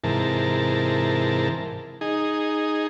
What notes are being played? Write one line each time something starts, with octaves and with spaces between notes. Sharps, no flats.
G#2 C3 E3 A#4 A5
D#4 G#4